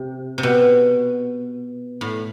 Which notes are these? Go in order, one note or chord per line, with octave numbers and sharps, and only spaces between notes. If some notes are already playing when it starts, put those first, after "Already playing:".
Already playing: C3
C3
B2
A2